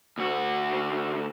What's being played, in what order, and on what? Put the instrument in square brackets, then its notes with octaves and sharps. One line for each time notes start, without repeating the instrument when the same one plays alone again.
[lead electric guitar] D2 F#4